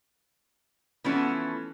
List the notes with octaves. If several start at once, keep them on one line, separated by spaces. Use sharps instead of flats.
E3 F3 A3 B3 C#4 F#4